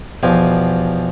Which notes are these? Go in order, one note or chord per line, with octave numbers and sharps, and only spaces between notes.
E2 B2 F3 G4 G#5